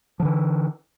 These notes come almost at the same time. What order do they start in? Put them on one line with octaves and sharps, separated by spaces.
F3 D3 E3